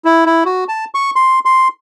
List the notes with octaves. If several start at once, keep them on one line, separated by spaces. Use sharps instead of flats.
E4
E4
F#4
A5
C#6
C6
C6